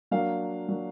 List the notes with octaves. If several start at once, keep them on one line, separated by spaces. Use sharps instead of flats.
F#3 A#3 D4 F5
F#3 A#3 D4